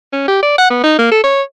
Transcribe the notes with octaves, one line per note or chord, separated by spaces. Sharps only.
C#4
G4
D5
F#5
B3
D#4
A#3
A4
C#5